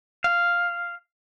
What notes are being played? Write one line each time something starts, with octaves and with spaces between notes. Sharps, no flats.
F5